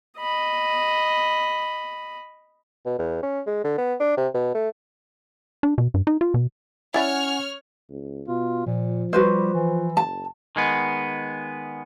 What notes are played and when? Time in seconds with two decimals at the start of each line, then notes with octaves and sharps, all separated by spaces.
0.19 D#5 B5
2.86 B2
2.99 E2
3.23 C#4
3.47 G#3
3.64 D3
3.78 B3
4.00 D4
4.17 C3
4.34 B2
4.55 A3
5.63 D4
5.78 B2
5.94 G2
6.07 D#4
6.21 F4
6.34 B2
6.94 C#4 E4 C#5 D5 E5 F#5 G#5 F6
7.90 C#2
8.28 B2 F4
8.66 A#2 F3
9.13 G3 F#4 B4 C5
9.54 E3
9.97 F#1 A5
10.56 D#3 G#3 B3